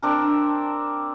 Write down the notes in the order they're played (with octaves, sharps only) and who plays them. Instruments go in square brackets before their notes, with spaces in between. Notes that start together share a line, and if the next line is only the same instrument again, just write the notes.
[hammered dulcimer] C4 D4 A#4